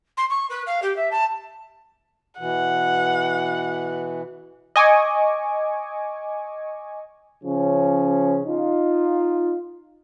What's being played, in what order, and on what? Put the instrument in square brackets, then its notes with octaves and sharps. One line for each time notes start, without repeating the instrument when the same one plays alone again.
[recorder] C6
C#6
B4
F5
G4
E5
A5
[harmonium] B2 E3 [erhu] F#5
[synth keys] D#5 G#5 C#6 D6
[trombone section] C#3 F3 C#4
D#4 F4